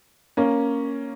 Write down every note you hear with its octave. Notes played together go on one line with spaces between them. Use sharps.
A#3 C#4